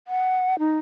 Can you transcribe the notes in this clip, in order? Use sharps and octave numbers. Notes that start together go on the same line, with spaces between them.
F#5
D#4